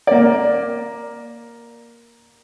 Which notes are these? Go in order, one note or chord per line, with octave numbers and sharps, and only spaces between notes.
A#3 D5